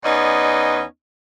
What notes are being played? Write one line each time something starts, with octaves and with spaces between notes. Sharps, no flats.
E2 B3 C#4 D#4 D5 D#5